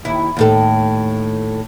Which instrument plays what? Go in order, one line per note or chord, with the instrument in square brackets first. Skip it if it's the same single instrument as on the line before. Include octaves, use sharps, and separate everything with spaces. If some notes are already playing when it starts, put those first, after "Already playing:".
[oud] D#2 E4
D#2 A2 A4